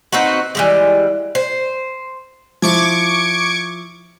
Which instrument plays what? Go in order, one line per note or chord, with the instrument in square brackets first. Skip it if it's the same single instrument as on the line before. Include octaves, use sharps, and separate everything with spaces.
[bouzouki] C4 D#4 F#4 B4
E3 G3 G#3
C5
[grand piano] F3 E4 [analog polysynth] C#6 D6 G#6